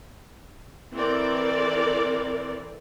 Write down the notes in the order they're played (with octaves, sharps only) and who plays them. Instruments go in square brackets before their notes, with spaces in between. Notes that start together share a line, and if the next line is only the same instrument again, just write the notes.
[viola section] E3 C4 A4 A#4 D5